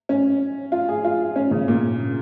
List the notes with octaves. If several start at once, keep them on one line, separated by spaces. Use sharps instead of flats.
C#4
F4
G#4
F4
C#4
C#3
A#2